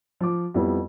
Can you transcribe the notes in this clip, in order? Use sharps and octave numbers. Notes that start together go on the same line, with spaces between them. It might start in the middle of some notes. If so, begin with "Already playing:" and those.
F3 D6
F2 G3 B3 E4